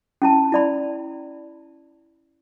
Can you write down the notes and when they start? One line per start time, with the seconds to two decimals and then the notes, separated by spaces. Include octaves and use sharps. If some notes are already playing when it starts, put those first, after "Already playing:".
0.22 C#4 E4 A5
0.52 E4 D5 B5